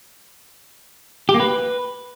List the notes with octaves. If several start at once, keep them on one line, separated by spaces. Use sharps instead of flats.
G4
A#3
B4